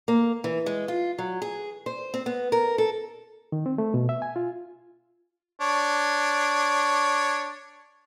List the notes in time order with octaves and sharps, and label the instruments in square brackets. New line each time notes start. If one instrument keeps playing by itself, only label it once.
[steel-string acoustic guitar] A#3
E3
G#3
F4
F#3
G#4
C5
C4
B3
A#4
A4
[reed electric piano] D#3
C4
A3
B2
E5
G#5
F4
[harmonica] D4 C#5